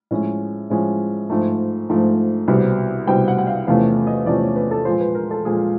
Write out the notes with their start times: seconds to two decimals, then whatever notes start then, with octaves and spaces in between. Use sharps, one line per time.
0.11 A2 F3 G#3 C#4
0.70 A2 F3 G#3 C#4
1.30 G#2 F3 A3
1.90 G#2 F3 A3
2.48 C2 B2 G3 C4
3.07 C2 B2 G3 C4 G5
3.28 F#5
3.38 F#5
3.47 F5
3.67 E2 C3 F3 A3 C#4 F5
4.07 D#5
4.26 E2 C3 F3 A3 C#4 D5
4.41 C#5
4.56 B4
4.71 A4
4.85 A#2 F3 G#3 C5
5.01 B4
5.15 A#4
5.31 A4
5.45 A#2 F3 G#3 G#4